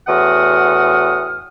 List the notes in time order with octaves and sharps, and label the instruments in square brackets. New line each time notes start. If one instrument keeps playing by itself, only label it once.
[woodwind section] E2 A2 F#4 F#5 D#6 F6